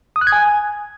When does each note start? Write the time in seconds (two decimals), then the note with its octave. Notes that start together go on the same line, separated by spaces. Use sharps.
0.16 D#6
0.21 F#6
0.27 G#6
0.32 G#5